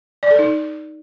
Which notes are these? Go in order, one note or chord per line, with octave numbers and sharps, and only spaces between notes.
D5
A4
D#4